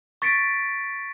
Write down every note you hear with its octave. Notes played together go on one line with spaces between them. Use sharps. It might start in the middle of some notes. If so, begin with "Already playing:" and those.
C#6 A6 B6 C#7 D7